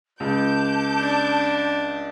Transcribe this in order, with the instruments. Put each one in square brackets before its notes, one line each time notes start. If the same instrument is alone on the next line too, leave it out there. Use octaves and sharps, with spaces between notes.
[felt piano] C#2 [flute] A5 [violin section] D6 G6
[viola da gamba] D4